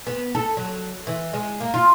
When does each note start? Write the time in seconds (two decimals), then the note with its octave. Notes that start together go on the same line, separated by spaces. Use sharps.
0.07 B3
0.35 A4
0.57 F#3
1.07 E3
1.34 G#3
1.60 A#3
1.74 F4